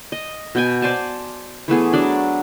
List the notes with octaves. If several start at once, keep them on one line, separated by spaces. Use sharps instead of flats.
D#5
B2 G5 G#5
C5 D5 G#5 A5
E3 A3 B3 G#4
F#3 D4 D5